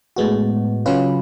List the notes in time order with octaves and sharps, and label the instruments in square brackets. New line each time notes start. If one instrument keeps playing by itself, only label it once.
[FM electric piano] A2 G#3 B3 F#4
C#3 F#3 C#4 F4 B4